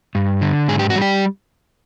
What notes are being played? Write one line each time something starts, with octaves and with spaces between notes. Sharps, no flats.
G2
D3
G#2 G#4
G4
F#4
G3
G4